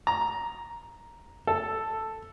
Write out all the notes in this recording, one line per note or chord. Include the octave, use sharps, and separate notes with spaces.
A#5
A4